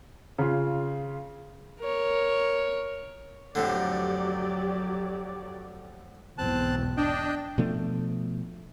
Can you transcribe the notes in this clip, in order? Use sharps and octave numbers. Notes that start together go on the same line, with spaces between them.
C#3 F4
A#4 C#5
F2 A2 D3 F#3 G4 D5
B1 E2 G#2 C4 A5 F#6
D4 D#5 G5
B2 F3 A3 D4